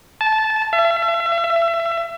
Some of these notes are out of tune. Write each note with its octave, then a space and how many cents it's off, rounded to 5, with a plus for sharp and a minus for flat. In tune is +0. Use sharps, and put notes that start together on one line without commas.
A5 -15
E5 +40
E5 +30